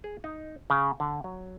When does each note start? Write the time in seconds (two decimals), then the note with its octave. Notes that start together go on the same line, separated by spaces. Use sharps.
0.04 G#4
0.24 D#4
0.70 C#3
1.00 D3
1.24 F#3